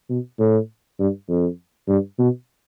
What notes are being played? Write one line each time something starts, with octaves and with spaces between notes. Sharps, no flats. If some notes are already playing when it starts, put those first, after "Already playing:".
B2
A2
G2
F2
G2
B2